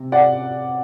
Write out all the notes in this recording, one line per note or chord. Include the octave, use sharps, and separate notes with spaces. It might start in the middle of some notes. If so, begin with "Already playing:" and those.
Already playing: C3
D5 F#5